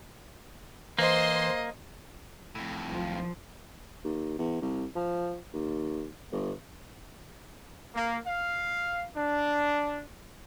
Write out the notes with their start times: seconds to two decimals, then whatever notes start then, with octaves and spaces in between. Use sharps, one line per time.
0.99 E3 A#3 C5 D#5 C6
2.55 F2 A2
2.91 B1 F3
4.04 D#2
4.39 E2
4.62 C2
4.95 F3
5.53 D#2
6.32 G1
7.95 A#3
8.26 F5
9.16 D4